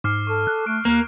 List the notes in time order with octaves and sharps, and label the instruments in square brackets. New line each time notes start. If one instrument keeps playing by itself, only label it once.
[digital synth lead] G#2 [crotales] D6 F6 C7
[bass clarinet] A4 [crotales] C#6
[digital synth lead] F#6
[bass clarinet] A3 [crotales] D6 D7
[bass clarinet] D#2 [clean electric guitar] A#3